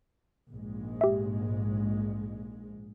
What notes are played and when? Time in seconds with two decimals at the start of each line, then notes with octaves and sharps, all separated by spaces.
0.52 A#1 G#2 G#3
1.01 G4 E5